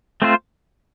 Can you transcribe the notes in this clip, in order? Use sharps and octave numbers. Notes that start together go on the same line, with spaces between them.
A3 C4 F4 C5